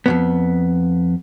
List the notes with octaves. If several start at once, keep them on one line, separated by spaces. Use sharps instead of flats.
F2 G#2 B3